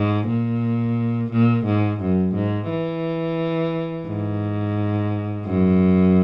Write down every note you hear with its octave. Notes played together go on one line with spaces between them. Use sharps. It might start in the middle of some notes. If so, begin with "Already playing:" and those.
Already playing: G#2
A#2
A#2
G#2
F#2
G#2
E3
G#2
F#2